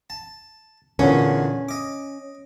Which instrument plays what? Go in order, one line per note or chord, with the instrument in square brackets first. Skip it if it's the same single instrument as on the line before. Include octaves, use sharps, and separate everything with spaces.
[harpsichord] A5
[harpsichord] E2 A#2 D3 [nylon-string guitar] C#4
[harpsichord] D#5 D6